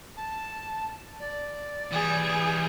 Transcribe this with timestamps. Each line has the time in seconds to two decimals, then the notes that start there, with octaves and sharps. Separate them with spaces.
0.17 A5
1.20 D5
1.92 E3 G3 G#4